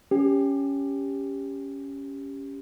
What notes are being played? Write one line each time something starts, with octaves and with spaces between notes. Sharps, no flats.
C#4 G4